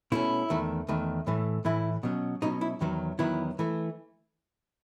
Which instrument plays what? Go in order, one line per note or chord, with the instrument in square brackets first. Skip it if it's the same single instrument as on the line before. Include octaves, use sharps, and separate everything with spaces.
[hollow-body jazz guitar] B2 A3 C#4 E4
E2 D#3 A3
E2 D#3 A3
A2 E3 A3
A2 E3 A3 E4
B2 F#3 C#4
B2 F#3 C#4 D#4
E4
E2 D#3 F#3 B3
E2 D#3 F#3 B3 E4
E3 A3